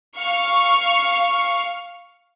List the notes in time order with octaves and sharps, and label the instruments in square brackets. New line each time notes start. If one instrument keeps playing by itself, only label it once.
[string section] F5 C#6 F6